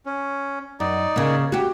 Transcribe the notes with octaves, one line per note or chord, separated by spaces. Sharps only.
C#4
F#2 D#4 D5
C#3 A#3
F#4 G4